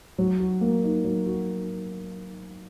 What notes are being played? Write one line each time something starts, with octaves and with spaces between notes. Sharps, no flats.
F#3
F#4
A#3
D#4
F#3
F#4